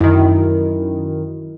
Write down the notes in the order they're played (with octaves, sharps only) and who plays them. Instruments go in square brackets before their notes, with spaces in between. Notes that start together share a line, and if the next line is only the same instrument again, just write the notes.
[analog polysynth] F#2 D#3 [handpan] E4